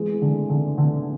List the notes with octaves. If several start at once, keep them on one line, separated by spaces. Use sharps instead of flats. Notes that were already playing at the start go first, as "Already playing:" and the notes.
Already playing: E3 G#3
D3
D3
D3